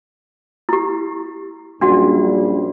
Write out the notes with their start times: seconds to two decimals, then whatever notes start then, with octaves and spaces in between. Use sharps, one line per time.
0.69 E4 G4
1.81 A#1 F#2 G3 D4 F#4 F#5